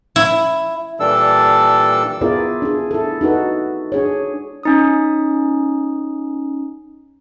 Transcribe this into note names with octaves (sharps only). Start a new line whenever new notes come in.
E4
A#2 E3 G3 D4 A4 E6
B3 E4 F4 G#4 A#4 D5
D4 G#4
E4 A4
D#4 F#4 A4 B4
D4 G#4 C#5
C#4 D#4 D#6